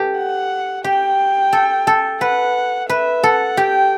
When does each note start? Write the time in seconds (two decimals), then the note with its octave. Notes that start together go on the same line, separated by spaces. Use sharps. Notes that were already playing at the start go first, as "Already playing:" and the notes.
Already playing: G4 A4 B4
0.17 F#5
0.84 G4 G5
1.53 A4
1.87 A4
2.21 B4 F#5
2.89 B4 E5
3.23 A4 F#5
3.57 G4 G5